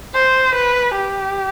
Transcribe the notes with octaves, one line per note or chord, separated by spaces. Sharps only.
C5
B4
G4